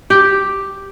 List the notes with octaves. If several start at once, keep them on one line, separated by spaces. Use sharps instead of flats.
G4 G5